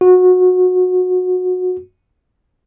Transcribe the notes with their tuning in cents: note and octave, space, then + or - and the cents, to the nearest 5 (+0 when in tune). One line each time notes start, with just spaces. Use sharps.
F#4 -20